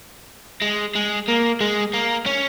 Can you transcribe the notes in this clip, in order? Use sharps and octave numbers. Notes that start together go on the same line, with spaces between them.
G#3
G#3
A#3
G#3
A#3
C#4